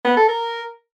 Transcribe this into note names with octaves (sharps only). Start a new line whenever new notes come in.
B3
A4
A#4